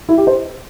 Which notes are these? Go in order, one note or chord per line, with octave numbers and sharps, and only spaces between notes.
E4
G4
C5